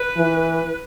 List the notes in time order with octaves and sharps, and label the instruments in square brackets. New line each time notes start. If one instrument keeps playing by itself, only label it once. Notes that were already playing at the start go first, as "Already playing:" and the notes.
Already playing: [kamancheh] B4
[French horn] E3